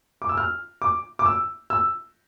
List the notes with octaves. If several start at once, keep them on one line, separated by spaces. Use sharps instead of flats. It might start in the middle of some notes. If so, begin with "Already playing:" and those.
D6
E6
F6
D6
D6
E6
E6